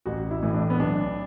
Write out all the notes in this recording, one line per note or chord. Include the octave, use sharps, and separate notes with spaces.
A1 F#4
E4
A2 E3
D4
B3
B1 D4